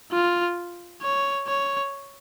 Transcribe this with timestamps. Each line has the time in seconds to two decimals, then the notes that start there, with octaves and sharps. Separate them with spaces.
0.12 F4
1.02 C#5
1.47 C#5